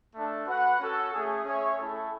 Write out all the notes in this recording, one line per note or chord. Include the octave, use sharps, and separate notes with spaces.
A3 D4 A4
F#4 B4 F#5
C#4 F#4 A4
A3 C#4 G#4
C#4 G#4 C#5 E5
A3 C#4 E4 A4